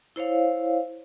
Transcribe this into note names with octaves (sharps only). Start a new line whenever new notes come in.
E4 C5 C#5 F5